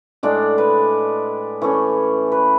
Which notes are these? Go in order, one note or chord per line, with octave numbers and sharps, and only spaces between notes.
A2 G#3 D4 D5
B4
E3 A3 C#4 C#5
B4